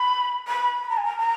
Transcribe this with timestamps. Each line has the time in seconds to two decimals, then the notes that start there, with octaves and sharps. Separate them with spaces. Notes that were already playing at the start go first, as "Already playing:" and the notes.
Already playing: B5
0.47 B5
0.82 B5
0.89 A#5
0.97 G#5
1.04 A#5
1.18 A#5